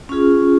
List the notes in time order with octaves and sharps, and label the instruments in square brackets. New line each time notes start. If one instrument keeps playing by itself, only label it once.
[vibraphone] C#4 F4 G#4